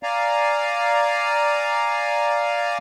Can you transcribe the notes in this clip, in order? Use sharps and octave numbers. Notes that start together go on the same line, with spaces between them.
D5 F5 G#5 A#5